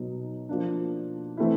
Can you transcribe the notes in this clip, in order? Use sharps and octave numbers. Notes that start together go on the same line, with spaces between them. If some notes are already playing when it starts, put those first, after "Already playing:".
Already playing: B2 F#3 B3 D#4
F3 A#3 D4
E3 A3 C4 E4